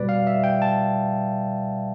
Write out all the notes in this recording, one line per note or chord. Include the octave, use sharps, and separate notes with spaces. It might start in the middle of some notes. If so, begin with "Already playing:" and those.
Already playing: B2 G3 B4 D5
F5
E5
G5
A5